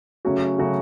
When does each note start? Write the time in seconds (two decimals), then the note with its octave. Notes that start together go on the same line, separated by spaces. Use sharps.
0.25 C#3 F#3 A3 C#4 F#4
0.58 C#3 F#3 A3 C#4 F#4